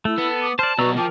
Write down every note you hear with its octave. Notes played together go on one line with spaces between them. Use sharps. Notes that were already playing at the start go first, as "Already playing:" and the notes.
A3 E4 E6
B3 A4
D6 D#6
C5 D5 A5 F6
B2 F#3 F#4 B4 D5 A#5 C#6 E6
F3 A#4 G5 A5 D6